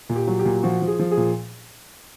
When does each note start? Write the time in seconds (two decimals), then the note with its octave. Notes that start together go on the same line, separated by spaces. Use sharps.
0.09 A#2
0.16 G4
0.27 F#3
0.39 G4
0.45 A#2
0.63 F3 F#4
0.82 F3
0.88 G#4
0.99 F3
1.11 G#4
1.17 A#2